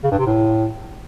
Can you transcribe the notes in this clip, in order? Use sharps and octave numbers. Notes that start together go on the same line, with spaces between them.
C#3
G2
C3
A2